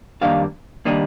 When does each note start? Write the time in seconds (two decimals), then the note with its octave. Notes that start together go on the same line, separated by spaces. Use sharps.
0.21 F2 D#3 G3 A#3 D4 F5
0.85 D#3 G3 A#3 D4 D#5